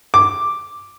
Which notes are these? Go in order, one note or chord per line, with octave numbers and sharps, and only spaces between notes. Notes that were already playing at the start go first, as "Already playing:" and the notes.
D6